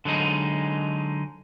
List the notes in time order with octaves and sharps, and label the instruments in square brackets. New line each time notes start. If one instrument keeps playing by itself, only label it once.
[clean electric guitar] D3 F#3 G#3 D#4